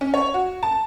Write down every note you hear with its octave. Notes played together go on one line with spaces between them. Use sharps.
C#4
C#5
F#4
A5